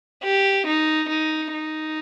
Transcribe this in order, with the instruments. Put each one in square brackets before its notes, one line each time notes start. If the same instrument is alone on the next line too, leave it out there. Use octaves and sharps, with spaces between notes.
[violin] G4
D#4
D#4
D#4